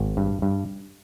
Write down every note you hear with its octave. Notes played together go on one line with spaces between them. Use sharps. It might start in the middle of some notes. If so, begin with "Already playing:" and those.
Already playing: G#1
G2
G2